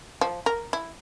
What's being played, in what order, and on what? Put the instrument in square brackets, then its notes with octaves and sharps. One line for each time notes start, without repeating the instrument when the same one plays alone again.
[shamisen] F3
A#4
E4